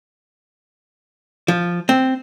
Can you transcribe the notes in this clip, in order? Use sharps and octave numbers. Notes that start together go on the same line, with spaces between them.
F3
C4